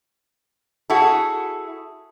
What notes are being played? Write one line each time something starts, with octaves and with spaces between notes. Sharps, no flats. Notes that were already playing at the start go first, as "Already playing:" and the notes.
E4 F#4 G#4 A4